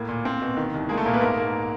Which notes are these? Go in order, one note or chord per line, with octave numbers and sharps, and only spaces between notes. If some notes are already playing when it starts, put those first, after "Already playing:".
Already playing: A2 A#3
A#2
C4
B2
D#3
C2
G#3 A#3 G#4
A3 A4
A#2 A#3 A#4
B3 B4
G#2 A#3 A#4
A#3